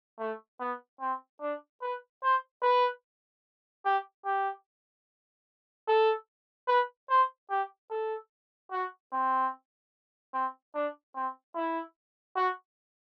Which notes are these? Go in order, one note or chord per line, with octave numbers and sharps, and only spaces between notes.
A3
B3
C4
D4
B4
C5
B4
G4
G4
A4
B4
C5
G4
A4
F#4
C4
C4
D4
C4
E4
F#4